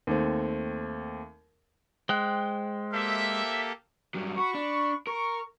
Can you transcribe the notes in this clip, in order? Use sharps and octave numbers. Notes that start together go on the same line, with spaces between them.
D#2 A3 C4
G#3 C5 G5 F#6
A#3 G4 A4 E5
G2 F#3
F#4 B5 C#6
D4
A#4 C#6